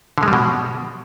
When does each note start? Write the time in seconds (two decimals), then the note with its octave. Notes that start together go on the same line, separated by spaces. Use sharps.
0.18 D3
0.23 G#3
0.28 G3
0.33 B2